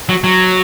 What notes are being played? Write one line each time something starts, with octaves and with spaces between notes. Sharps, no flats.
F#3
F#3